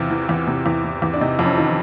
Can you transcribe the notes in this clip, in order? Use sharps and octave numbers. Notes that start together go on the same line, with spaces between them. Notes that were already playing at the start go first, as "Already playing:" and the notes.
Already playing: E2 C3 F4
E3
E2
C3
E2
E3
E2
D4
C3 D#4
F2
C#4
D#3